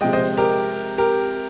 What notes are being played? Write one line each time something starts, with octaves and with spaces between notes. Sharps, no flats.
C3 F3 G#3 D#5 G5
C5 D#5
G4 A#4
G4 A#4